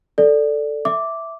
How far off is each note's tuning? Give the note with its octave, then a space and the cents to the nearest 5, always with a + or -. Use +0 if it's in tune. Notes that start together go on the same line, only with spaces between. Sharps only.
A4 +5 D5 +0
E5 +0 D6 -5